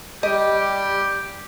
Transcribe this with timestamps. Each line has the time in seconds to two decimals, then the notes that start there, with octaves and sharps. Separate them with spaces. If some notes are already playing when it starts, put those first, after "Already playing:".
0.23 G3 G4 D#5